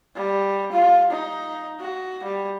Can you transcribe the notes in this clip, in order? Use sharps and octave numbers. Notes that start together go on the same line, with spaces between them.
G3
F4
D#4
F#4
G3